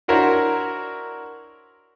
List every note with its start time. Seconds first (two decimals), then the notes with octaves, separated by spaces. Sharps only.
0.08 D4 E4 F#4 A#4 C5 C#5